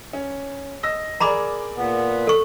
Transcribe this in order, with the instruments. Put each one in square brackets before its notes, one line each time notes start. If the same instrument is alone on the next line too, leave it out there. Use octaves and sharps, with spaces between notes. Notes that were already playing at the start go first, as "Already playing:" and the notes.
[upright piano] C#4
D#5 E6 A#6
[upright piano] G#4 A#4 D5 [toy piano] A#5 B5 D6
[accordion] A#2 B3
[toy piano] A4 C#6